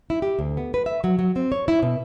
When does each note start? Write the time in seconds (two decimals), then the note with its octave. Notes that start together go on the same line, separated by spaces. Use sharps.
0.10 E4
0.22 G4
0.39 D2
0.57 B3
0.74 B4
0.86 E5
1.04 F#3
1.19 F#3
1.36 C4
1.52 C#5
1.68 E4
1.83 B2